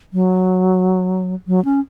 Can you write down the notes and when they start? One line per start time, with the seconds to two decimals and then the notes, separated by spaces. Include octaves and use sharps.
0.13 F#3
1.48 F#3
1.65 C#4